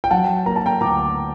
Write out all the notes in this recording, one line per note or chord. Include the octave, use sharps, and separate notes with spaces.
G5
F#3 F#5 A5
A#3 A#5
A5
G5 A#5
D2 A#5 D6